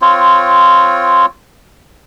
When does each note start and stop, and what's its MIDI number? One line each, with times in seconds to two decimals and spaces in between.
0.02 1.26 60
0.02 1.26 65
0.02 1.26 73